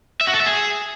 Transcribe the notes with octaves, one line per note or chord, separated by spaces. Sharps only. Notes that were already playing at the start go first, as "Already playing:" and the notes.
E5
F#4
A4
E5
G#4